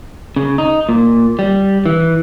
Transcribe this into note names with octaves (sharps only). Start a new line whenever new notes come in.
C#3
D#4
A#2
G3
E3